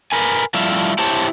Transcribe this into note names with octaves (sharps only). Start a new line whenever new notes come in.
A#4 B4 G#5
F3 G3 A3 E4 E5 F5
E4 G4 C5 C#5 A5